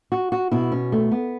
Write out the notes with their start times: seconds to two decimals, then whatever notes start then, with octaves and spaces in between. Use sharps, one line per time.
0.12 F#4
0.32 F#4
0.52 B2 E4
0.72 C#4
0.92 A3
1.12 B3